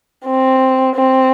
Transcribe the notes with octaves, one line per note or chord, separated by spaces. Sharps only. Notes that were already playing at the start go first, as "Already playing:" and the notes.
C4
C4